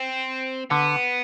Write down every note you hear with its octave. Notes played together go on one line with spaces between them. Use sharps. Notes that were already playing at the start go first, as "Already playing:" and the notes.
Already playing: C4
D3 B3